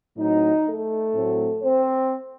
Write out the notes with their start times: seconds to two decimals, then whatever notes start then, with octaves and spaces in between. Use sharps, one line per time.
0.17 A2 F#3 C4 D#4
0.66 A3 A4
1.14 A2 F#3 C4
1.62 C4 C5